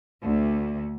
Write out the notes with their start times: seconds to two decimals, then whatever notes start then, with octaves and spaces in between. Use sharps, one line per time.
0.24 D2